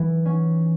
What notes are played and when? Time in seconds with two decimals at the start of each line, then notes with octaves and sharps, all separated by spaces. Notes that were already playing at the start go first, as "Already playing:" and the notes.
Already playing: E3
0.25 C#4